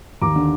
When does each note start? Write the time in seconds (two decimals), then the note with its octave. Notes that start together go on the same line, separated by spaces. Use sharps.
0.22 D#2 A#5 D6
0.36 D3